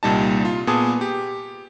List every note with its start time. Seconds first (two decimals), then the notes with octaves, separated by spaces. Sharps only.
0.03 C2 A#2 G3 D#4 A5
0.45 F4
0.67 A#2 B3 G#4 G#5 A5 D#6
1.01 G4